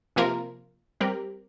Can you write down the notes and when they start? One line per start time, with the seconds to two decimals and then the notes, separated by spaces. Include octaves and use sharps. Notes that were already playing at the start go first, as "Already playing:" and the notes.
0.16 C3 F3 A#3 F4 A#4
1.00 G3 C4 G4 A#4